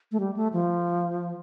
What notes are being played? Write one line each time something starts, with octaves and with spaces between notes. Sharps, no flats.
A3
G3
A3
F3